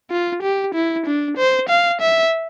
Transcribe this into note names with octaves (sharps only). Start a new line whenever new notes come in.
F4
G4
E4
D4
C5
F5
E5